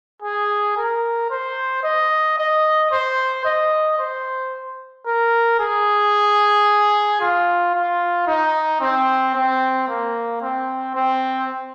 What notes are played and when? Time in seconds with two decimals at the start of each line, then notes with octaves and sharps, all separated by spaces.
0.22 G#4
0.77 A#4
1.30 C5
1.83 D#5
2.38 D#5
2.91 C5
3.45 D#5
3.98 C5
5.06 A#4
5.59 G#4
7.21 F4
7.74 F4
8.27 D#4
8.81 C4
9.35 C4
9.88 A#3
10.42 C4
10.95 C4